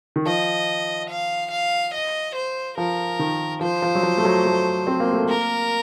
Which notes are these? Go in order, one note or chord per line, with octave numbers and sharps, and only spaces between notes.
D#3
F3 D#5
F5
F5
D#5
C5
F3 A#4
D#3
F3 C5
F3
F#3
F3
A3
F#3
A3
C4
A#3
A3
A#3 A#4